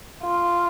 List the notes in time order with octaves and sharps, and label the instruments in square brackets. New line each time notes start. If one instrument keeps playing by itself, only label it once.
[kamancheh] F4